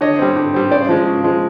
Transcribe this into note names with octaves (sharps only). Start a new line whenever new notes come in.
D3 C#5 D#5
G3 C4
D3
G3 C4
C#3 C5 D5
F3 G#3
C#3
F3 G#3